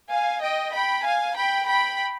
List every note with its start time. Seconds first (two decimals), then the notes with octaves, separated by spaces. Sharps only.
0.10 F5 G#5
0.42 D#5 G5
0.73 G5 B5
1.04 F5 G#5
1.36 G5 B5
1.67 G5 B5